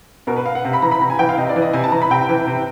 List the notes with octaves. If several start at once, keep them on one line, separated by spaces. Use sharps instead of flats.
B2 A#4
B4
F5
F#5
C3
B5
E3 A#5
B5
C3 A#5
G#5
E3 G5
F5
C3 D#5
D5
E3
D#5
C3 G#5
A5
E3 A#5
B5
C3 G5
E3
C3